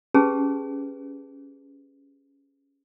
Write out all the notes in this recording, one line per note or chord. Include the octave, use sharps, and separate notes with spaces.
C#4 G4 G#4 B4 A5